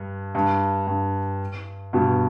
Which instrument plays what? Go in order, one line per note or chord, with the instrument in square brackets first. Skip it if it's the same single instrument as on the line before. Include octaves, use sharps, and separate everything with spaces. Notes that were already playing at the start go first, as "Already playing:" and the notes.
Already playing: [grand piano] G2
G2
G2
G2 B2